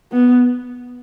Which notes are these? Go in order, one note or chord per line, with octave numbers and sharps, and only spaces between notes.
B3